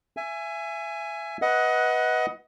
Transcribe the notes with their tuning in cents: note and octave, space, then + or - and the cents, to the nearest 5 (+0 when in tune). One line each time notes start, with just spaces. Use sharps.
E5 +25 G#5 +0
B4 -5 D#5 +25 F#5 +0